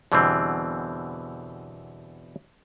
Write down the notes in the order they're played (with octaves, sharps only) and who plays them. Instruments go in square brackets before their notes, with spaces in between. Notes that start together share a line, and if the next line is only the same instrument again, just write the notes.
[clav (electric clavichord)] E2 B2 D3 E3 G3 C4